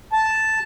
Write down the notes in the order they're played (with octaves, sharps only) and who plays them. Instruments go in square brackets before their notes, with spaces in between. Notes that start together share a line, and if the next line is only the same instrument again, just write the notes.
[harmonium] A5